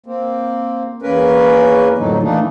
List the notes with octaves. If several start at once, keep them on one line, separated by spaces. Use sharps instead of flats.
A#3 C4
E2 A#3 C#4 A#4 B4
F2 A2 D3 F#3 D#4
D#3 E3 A3 A#3 D4 D#4